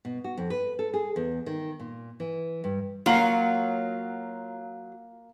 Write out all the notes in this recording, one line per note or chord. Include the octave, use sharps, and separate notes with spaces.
B2
F#4
F2
B4
A4
G#4
E2
D#3
A#2
E3
G2
F#3 A#3 F4 A#5 F#7